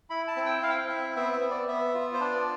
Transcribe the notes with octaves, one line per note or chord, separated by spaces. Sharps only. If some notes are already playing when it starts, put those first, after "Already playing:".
E4 B5
A5
C4
G5
E4 F5
G5
F5
C4 E5
B3 E5
E5
B3
D5
B3 E5
F4
C5
D4 D5